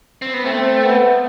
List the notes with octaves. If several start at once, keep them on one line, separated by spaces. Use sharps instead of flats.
C4
B3
A3 C4
B3